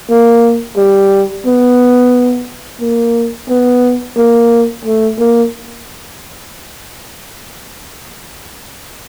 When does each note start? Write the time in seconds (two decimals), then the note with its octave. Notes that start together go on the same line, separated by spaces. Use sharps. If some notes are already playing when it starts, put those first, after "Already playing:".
0.10 A#3
0.77 G3
1.46 B3
2.81 A#3
3.49 B3
4.17 A#3
4.85 A3
5.19 A#3